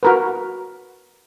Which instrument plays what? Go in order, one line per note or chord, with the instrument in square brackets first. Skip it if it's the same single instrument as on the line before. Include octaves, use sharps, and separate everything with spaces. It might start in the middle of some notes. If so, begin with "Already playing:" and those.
[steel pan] F#4 A#4 B4